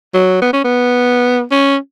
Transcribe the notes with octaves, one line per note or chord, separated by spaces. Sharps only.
F#3
B3
C#4
B3
C#4